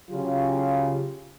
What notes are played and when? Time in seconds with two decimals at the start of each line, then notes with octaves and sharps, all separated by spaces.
0.10 C#3 F#3 F4 G4